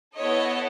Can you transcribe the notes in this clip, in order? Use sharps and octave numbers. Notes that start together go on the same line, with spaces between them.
B3 E4 A4 C#5 D#5